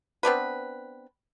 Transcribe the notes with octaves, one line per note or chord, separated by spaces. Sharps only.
B3 C4 D4 B4